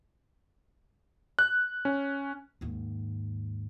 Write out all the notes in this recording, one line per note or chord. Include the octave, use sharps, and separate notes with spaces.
F#6
C#4
D#2 G#2